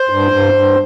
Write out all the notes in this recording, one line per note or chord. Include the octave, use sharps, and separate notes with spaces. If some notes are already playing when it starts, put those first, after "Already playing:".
Already playing: C5
G2
G2
G2